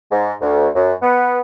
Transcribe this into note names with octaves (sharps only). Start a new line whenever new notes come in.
G#2
D2
F#2
B3